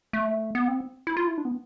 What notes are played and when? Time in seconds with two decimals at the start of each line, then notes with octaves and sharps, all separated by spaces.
0.13 A3
0.55 B3
0.68 C4
1.07 E4
1.17 F4
1.27 E4
1.38 D4
1.45 B3